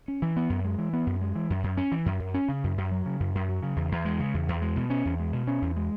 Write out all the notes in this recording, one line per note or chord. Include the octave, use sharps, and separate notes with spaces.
C#4
E3
B3
F#2
G#3
E3
B3
F#2
G#3
E3
F#2
F#2
C#4
E3
F#2
F#2
C#4
C#3
F#2
F#2
F#3
C#3
F#2
F#2
F#3
C#3
E2
E2
G#3
C#3
E2
E2
G#3
B2
C#4
E2
G#3
B2
C#4
E2
G#3